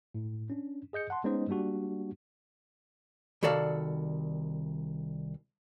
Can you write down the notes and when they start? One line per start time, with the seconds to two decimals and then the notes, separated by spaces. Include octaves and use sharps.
0.14 A2
0.50 C#4 D4
0.93 G#4 D#5 G6 C#7
1.10 F#5 A5 C6
1.24 G#3 B3 C#4 D#4 C5 D#5
1.49 G3 A#3 D4 F#4 G4
3.43 C2 D#3 F#4 A4 D5 F5